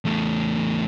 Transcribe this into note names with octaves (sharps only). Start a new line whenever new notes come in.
E2 A3